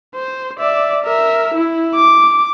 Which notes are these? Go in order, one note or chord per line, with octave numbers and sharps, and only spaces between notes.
C5
D5 E5
A#4 E5
E4
D6